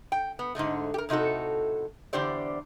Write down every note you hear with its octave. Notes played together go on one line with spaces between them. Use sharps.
G5
B3
G#2 D3 G#3 A3
G4 A#4
A2 C3 D#4 F#4 A4
E2 D3 D4 G4 C5 D5